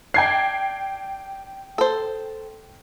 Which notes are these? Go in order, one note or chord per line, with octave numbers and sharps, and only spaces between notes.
D4 G5 G#6 C7
A4 C5